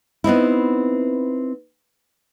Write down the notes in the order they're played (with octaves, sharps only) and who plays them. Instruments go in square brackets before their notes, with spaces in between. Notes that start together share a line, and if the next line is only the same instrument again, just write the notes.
[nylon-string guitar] B3 C4 D#4 E4